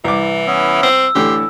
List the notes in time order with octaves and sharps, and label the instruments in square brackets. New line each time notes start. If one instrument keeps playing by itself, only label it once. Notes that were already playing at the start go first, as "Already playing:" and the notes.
[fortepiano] C2 D6 [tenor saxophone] E3
[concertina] B3 C#4 E4
[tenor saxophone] C4 [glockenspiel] E6
[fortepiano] A2 D3 E3 [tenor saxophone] G4 [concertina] C6